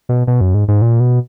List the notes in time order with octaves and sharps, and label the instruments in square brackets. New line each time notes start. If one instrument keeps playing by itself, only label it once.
[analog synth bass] B2
B2
F#2
G#2
G#2
A#2
B2